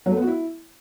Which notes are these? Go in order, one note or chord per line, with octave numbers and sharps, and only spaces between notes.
F#3
A3
B3
F#4
E4